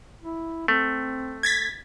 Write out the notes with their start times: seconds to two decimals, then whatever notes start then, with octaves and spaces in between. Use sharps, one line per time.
0.22 E4
0.68 A3 C4
1.43 G#6 A6 B6